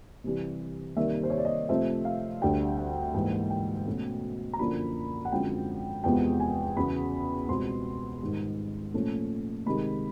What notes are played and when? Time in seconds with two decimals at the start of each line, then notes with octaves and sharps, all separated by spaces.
0.24 C3 E3 G3
0.97 C3 D#3 G3 A#3 E5
1.23 C5
1.30 C#5
1.38 D5
1.45 D#5
1.69 C3 F3 A3 C4 E5
2.05 F5
2.41 D2 D3 G3 G5
2.77 F#5
3.14 G#2 E3 G3 A#3 G5
3.50 G5
3.87 B2 F#3 A3 C#4
4.53 A#5
4.59 F#2 D3 F3 A#3 B5
5.25 F#5
5.31 F#2 D3 F3 G#3 C4 G5
6.04 E2 C3 F3 G#3 B3 G5
6.40 G#5
6.76 E2 C#3 F#3 B3 B5
7.49 C#2 B2 G3 C4 C6
8.21 G#2 D#3 G3
8.94 A#2 F3 A3 C#4
9.66 C3 D#3 G#3 B5